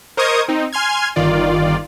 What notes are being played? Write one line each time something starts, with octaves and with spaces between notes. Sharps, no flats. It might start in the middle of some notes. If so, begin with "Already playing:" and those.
A#4 C5 D#5 C#6 D#6 G#6
C4 D#4
G#5 C6 F6 G#6
G1 D#3 F4 D5